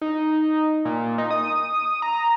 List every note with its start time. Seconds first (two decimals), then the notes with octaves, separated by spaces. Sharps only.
0.02 D#4
0.85 A#2
1.18 D#4
1.31 D#6
2.02 A#5